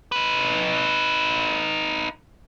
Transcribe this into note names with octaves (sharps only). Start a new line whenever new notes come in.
D#4 B4